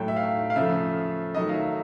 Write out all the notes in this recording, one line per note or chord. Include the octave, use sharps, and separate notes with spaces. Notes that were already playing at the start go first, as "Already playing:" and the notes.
Already playing: A2 F#3 A3 G5
E5
F5
F5
C#3 F3 A3 E5
D#3 F#3 A3 D#5
F5
E5